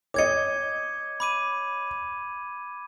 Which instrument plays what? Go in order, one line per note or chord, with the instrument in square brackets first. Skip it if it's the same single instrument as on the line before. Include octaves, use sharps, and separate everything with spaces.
[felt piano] C#5 D#5 [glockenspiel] D6 G#6 C#7
[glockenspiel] B5 D6 D#7